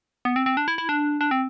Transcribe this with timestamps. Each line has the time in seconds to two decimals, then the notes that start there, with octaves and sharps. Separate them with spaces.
0.25 B3
0.36 C4
0.46 C4
0.57 D4
0.68 E4
0.78 E4
0.89 D4
1.21 D4
1.31 C4